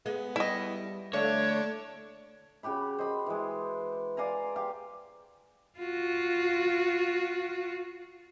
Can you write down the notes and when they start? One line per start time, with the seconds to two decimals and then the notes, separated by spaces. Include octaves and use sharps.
0.06 G#3 B3
0.36 G3 E4 D#5
1.13 D3 A3 D4 C#5
2.63 C#3 F#4 G4 B5
2.98 C5 D#5 B5
3.26 E3 G#3
4.17 D5 F5 G#5 A#5
4.56 G4 F5
5.79 F4 F#4